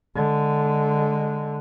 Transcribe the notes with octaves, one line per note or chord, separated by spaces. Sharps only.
D3 G#3